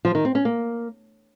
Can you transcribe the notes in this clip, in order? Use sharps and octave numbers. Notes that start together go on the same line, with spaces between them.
F3
D#3
C4
C#4
A#3